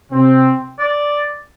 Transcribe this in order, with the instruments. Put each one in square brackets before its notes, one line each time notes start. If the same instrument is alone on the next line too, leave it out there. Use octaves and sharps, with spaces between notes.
[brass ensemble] C3 C4
[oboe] D5